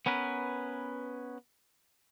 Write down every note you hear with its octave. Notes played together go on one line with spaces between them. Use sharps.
B3 C#4 A#4 B4